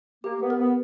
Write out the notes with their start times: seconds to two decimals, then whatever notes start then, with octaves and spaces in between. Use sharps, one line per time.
0.24 A#3 G4
0.42 B3
0.50 A#4
0.59 B3